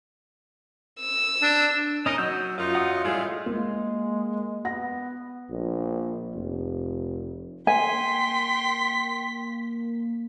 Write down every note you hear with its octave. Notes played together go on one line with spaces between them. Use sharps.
E6
D4
C#4 D#4 A#4 D#5
F#3 E6 G6
F#2 D#4 F4
F#5 D#6
A2 G3 G#3 E4 F4 G#4
G#3 A#3
B3 F#5 A#6
A#1
F1
A#3 G5 G#5 C6 B6